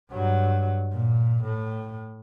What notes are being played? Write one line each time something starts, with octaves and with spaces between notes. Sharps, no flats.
G2 F#3
A#2
A2